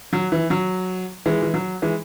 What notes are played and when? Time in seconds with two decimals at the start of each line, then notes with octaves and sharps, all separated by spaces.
0.13 F#3
0.32 E3
0.50 F#3
1.26 E3 G#3
1.42 E3
1.54 F#3
1.82 E3 G#3